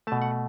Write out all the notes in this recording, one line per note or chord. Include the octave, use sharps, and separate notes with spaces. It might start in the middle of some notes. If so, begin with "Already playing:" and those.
B2 A3 A5
F#5